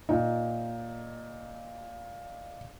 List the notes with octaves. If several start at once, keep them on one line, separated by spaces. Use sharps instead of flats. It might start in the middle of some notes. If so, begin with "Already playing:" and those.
A#2 D#4